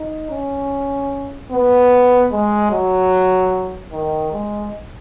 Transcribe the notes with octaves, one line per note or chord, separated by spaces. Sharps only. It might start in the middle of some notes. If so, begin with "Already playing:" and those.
Already playing: D#4
C#4
B3
G#3
F#3
D#3
G#3